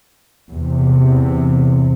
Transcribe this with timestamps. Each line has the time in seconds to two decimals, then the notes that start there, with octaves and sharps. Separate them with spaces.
0.51 E2 C3